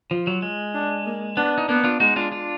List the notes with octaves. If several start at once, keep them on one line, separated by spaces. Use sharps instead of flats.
F3 F4
F#3
G#3
D4
A#3
B3 D4
D#4
A#3 B3 D4
D4 F4
G#3 D#4 F#4
D4 F4
D4 F4